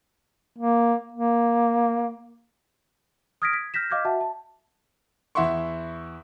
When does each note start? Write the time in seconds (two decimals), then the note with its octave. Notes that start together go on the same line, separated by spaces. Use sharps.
0.59 A#3
1.13 A#3
3.42 D#6 F6 G#6 A#6 B6 D7
3.53 G#6 B6
3.74 F6 G6 A#6 B6 E7
3.90 D#5 F5 D6 F6 G6 G#6
4.05 F#4 E5 F#5 A5
4.21 A5
5.35 E2 E4 E5 F#5 C6 C#6